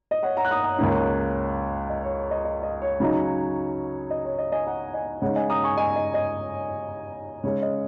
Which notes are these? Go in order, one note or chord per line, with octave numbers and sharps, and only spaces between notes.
D#5
C#5 F#5
F#5 A#5
F#6
A#5 D#6
A#5 D#6
C#2 C#3 A#3 C#4
D#5
C#5
D#5
D#5
D#5
C#5
C#3 F#3 D#4
D#5
C#5
D#5
D#5 G#5
F#5 A#5
D#5 G#5
C#3 G#3 D#4 C#5 F#5
D#5 G#5
A#5 D#6
G#5 C#6
D#5 G#5
D#5
D#5
C#3 G#3 C#4 C#5
D#5